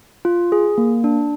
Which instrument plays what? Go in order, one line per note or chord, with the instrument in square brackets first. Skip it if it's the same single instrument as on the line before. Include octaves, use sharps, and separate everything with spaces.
[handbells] F4
G#4
A#3
D4